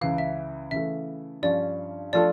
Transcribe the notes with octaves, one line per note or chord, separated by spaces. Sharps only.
C#2 C#3 E3 F5
E5
C#3 E3 A3 E5
G2 F3 C#4 D5
F3 A3 D4 F4 A4 D5